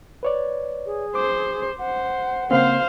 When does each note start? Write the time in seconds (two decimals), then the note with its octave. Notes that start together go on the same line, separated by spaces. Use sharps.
0.23 B4 C#5 D5
0.86 G#4
1.15 C5 D6
1.78 C5 F#5
2.51 C#3 A#3 C4 C5 F5